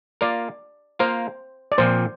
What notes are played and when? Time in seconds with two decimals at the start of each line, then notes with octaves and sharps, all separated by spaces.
0.21 A#3 F4 A#4 D5
0.99 A#3 F4 A#4 C5
1.72 D5
1.78 A#2 F3 C4 C5